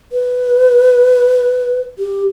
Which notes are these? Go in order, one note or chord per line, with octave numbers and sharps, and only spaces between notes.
B4
G4